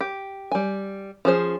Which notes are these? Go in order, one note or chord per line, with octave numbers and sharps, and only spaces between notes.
G4
G3 G#5
F3 C#4 G#4 C5